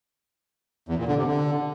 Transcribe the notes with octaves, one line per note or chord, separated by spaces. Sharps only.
E2
A#2
D3
C3
D3